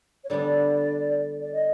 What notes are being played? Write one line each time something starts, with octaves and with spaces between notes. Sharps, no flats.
C#5
D3 G3 B3 D4 D5
D5
D#5